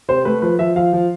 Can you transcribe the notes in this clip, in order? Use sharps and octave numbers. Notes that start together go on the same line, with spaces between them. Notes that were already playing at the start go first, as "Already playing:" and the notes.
C3 C5
A3 B4
F3 B4
F3 E5
F3 F5
F3